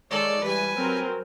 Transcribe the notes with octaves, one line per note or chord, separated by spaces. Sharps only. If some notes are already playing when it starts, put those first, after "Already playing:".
D#3 G#3 A4 C#5 D5
E3 G3 B4 G#5
F#3 C4 A#4